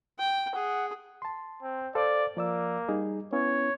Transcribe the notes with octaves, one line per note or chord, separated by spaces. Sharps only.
G5
G#4 F#5
A5 C6
C4
A4 C5 D5 F5
F3 A#3 D5 E6
G3 D#4 G#4
B3 C#4 E4 C#5